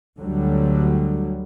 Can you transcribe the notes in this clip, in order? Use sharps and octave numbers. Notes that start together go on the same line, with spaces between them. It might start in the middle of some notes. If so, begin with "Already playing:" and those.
D2 D3 F#3 G3